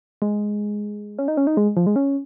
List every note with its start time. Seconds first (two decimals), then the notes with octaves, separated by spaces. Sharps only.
0.22 G#3
1.19 C#4
1.28 D#4
1.37 C#4
1.47 D#4
1.57 G#3
1.77 F3
1.87 G#3
1.96 C#4